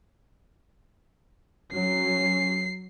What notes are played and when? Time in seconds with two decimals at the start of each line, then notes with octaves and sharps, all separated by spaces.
1.73 F#3 C#4 C7